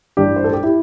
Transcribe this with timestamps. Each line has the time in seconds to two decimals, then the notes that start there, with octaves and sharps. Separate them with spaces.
0.17 A1 G2 G3 D4 G4
0.36 C5
0.44 A4
0.53 G4
0.63 E4